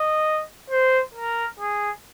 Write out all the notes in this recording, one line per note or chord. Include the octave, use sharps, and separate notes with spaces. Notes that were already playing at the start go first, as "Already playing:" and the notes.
Already playing: D#5
C5
A#4
G#4